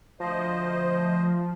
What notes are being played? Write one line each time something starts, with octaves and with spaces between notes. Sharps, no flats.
D2 F3 C5 D#5